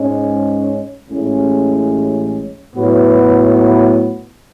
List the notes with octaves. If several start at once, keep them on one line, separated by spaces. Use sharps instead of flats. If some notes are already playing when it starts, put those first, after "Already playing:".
Already playing: G#2 G#3 C#4
A1 A2 G#3 C#4 G#4
A2 F#3 B3 F#4 B4